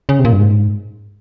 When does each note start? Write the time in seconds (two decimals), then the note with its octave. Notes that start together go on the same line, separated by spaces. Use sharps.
0.09 C#3
0.19 C3
0.25 A#2
0.33 G2
0.40 G#2